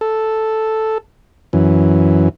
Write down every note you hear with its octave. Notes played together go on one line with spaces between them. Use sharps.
A4
F#2 E3